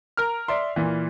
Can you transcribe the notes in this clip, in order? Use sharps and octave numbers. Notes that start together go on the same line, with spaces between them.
A#4 F6
D5 E5 C6
A#2 E3